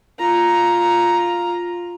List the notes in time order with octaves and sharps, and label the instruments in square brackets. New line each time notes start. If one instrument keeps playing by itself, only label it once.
[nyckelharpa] F4 A#5